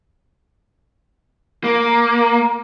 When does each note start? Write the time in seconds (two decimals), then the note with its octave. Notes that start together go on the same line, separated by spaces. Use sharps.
1.64 A#3